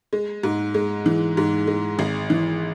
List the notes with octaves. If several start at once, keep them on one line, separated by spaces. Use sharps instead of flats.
G#3
G#2
G#3
E3
G#2
G#3
G#1
E3